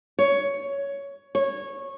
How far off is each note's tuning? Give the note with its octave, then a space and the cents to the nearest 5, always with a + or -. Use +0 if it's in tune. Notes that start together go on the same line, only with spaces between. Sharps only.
C#5 +10
C#5 -15